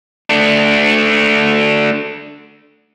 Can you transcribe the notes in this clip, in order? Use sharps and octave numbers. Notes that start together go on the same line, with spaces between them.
A3 D4